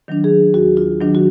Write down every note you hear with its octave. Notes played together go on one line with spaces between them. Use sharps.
D#3 F#3 D4
G#4
D#2 F#4
F4
D#3 F#3 D4
F#4